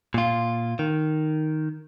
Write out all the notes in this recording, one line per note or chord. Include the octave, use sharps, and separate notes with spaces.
A#2 F4
D#3